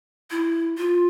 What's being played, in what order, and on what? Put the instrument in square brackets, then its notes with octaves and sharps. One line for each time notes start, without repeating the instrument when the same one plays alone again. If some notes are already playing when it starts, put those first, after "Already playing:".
[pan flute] E4
F4